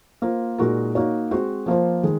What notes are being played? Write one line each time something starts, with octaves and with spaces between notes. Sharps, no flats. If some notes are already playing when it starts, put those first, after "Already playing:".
A#3 F4 C5
A#2 G#3 D#4 F#4 A#4
A#3 D#4 F#4 C#5
G#3 C4 F#4 C5
F3 A#3 F4 C5
D#3 G#3